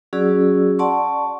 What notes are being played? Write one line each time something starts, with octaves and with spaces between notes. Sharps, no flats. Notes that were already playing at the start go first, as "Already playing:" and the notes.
F#3 C#4 F#4 G#4 D5 E6
D5 F#5 A5 C6 C#6